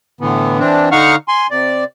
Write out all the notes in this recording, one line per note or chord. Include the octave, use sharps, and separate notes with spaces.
A2 D3 E3 B3
E3 C4 D4
D3 D#4 F5 F#5 C#6 F6
G#5 C6
C3 D5